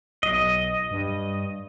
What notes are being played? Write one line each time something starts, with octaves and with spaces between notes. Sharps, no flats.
B1 D#5
G2